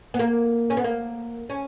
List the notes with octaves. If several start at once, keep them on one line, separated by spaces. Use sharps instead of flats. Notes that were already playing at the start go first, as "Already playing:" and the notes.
B3
A#3
C#4
B3
A#3
C#4